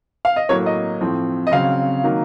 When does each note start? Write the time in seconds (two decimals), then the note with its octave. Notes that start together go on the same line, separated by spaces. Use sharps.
0.25 F5
0.36 D#5
0.49 A2 F#3 A#3 C#5
0.66 D#5
1.01 A2 F3 C4
1.47 D#5
1.52 C#3 F#3 C4 F5
2.04 D#3 F#3 A#3